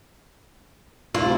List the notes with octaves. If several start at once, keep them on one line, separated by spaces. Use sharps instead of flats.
D2 C3 E4 F4